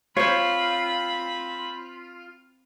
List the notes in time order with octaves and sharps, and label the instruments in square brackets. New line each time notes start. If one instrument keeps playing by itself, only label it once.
[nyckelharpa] C4 B5 [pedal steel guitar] F4 [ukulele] C5 C#5